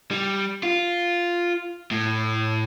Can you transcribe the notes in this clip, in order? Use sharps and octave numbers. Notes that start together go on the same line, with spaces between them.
G3
F4
A2